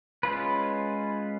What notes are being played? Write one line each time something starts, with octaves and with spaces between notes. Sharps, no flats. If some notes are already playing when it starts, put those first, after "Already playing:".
G#3 C#4 F4 B4